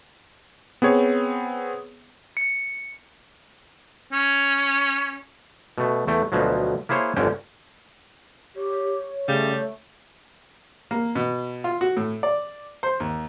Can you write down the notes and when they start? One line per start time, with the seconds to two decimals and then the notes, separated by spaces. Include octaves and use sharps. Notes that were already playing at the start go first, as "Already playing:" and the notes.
0.82 B3 C4 G#4 C#5
2.37 C#7
4.13 C#4
5.78 B2 A3
6.07 E2 A3 G5
6.32 D2 B2 F3 F#3
6.89 A#3 E4 G#4 C5 C#5
7.16 G1 F2 D3 C#4 G5
8.56 G4 C#5
9.28 C#3 G3 A3
10.91 A#3
11.15 B2
11.64 F4
11.81 F#4
11.97 A2
12.23 D5
12.83 C5
13.00 D#2